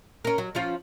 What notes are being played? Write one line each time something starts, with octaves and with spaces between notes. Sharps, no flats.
C#4 A#4
F#3
F3 C#4 F4